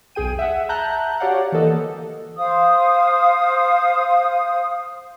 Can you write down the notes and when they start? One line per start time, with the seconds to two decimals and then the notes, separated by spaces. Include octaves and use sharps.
0.15 B1 E2 G#4 G5 D#7
0.39 E5 F#5
0.69 E5 A5 A#5 F#6 G6
1.20 F#4 G4 C#5 D5 F5 F#5
1.52 E3 A#3 A4 D#5
2.38 C5 F5 D#6